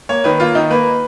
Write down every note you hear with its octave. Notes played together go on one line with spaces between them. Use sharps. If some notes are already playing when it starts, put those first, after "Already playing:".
A#3 C#5
D#3 B4
A#3 F4
D#3 D#4
A#3 B4